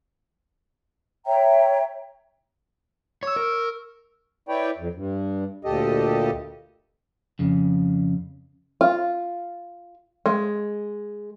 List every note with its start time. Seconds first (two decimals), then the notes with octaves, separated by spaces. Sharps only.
1.26 C#5 E5 G5 A#5
3.23 C#5 C#6 E6
3.36 A#4
4.49 E4 B4 C#5 D5 G5
4.78 F2
4.95 G2
5.65 D2 A#2 G4 A4 D#5
7.39 F2 C#3
8.81 F4
10.26 G#3